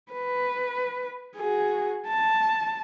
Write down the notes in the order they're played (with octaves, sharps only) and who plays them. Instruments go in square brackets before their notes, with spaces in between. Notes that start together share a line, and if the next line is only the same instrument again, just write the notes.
[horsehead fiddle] B4
F#4 G#4
A5